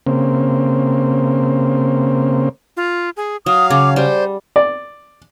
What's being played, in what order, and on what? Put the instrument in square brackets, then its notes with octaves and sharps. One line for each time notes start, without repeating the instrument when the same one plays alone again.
[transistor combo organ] C#3 A#3 C4
[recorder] F4
G#4
[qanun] F#3 [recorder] F5 [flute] D#6
[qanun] C#3 [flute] D6
[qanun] G3 [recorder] C5 [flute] D5
[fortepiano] D5